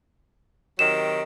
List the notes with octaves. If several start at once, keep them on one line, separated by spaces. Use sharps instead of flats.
C3 D#3 F#3 E7